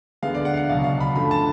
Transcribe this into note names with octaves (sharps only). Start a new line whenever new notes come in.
D2 D3 G#3 B3 F5
D5
F#5
F5
F#5
C#2 B2 F#3 F5
F5
B5
F#2 D3 F3 A3 B5
A5